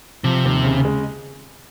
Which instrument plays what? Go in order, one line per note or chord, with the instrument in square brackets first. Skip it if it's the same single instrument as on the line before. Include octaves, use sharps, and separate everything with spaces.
[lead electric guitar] C3 [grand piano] F3
[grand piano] D#2
C#3
G#3